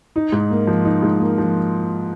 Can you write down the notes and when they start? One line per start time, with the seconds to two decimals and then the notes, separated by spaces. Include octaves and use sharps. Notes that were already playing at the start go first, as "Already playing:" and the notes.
0.16 D#4
0.32 G#2
0.51 A#3
0.67 F3
0.85 D#4
1.03 G#2
1.20 A#3
1.38 F3